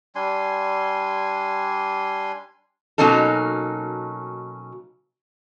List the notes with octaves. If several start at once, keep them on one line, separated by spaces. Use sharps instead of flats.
G3 D4 G#5 C6
B2 F#3 A#3 C#4 D#4 A4